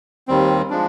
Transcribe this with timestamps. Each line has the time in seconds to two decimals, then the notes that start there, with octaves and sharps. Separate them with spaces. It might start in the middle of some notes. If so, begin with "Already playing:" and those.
0.28 D#2 D#3 G3 C4
0.70 F3 G#3 D4